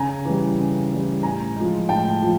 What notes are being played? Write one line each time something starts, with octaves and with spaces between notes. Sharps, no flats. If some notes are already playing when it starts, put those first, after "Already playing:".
Already playing: C#3 G#5 A#5
E3 G3
C#3
E3 G3
A2 G#5 A#5
F3 G#3
A2 G5 A5
F3